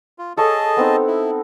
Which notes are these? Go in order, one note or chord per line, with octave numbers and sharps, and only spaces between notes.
F4
G#4 A4 C#5 D#5 F5 A5
B3 C4 D#4
E4